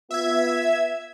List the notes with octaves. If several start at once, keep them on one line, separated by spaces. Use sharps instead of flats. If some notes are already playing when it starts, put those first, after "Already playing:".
B3 F4 E5 G#6